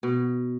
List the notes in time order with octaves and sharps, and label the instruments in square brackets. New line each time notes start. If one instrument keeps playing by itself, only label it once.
[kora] B2